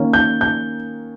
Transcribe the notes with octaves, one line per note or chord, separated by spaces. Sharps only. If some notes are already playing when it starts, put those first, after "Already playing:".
Already playing: D#3 A#3 C#4
G6
G6